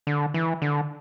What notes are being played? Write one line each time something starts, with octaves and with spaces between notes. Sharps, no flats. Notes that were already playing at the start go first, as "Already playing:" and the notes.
D3
E3
D3